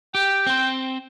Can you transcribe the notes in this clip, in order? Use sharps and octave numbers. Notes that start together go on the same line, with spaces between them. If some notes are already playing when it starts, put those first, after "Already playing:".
G4 G5
C4 C5